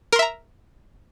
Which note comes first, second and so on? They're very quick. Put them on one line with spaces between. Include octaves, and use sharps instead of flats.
A#4 C6 E5 A#5